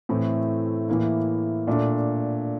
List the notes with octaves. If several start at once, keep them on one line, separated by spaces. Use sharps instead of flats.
A2 E3 A3 C4
A2 E3 A#3 E4
A#2 A3 D4